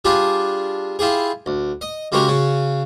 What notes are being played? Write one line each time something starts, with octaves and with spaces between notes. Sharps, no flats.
G3 D4 F4 G4 G#4
E4 F4 G4 G#4
D2
D#5
C#3 G#3 F#4 G4 A#4 C#5
C#3 F#4